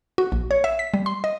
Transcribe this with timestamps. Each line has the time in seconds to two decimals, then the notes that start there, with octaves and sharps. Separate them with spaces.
0.18 F#4
0.32 A#1
0.51 C#5
0.64 E5
0.79 B6
0.94 G3
1.06 C6
1.24 D#5